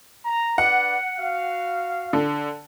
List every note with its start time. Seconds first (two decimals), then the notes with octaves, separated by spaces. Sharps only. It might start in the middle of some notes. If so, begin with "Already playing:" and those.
0.25 A#5
0.58 D4 B4 D5 F#5
1.19 F#4 F5
2.13 D3